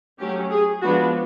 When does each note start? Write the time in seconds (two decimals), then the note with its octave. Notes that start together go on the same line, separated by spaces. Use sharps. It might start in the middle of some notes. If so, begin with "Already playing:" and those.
0.19 F#3 A3 C#4 G4
0.50 G#4
0.81 F3 G#3 B3 D4 F#4